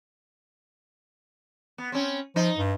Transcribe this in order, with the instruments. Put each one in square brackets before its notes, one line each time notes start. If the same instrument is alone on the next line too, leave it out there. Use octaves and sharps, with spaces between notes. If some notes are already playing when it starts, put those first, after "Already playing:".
[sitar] B3
C4 C#4
[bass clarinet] F3 [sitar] D#4
[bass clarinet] G2